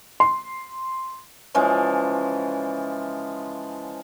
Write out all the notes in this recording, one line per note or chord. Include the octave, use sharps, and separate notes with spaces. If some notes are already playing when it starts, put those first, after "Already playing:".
C6
C#3 E3 F3 G#3